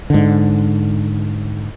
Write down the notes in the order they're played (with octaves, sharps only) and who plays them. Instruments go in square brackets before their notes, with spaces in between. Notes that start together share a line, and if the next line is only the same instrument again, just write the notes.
[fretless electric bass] G#2 D3